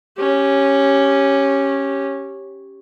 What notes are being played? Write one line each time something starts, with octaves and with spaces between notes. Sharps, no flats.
C#4 G4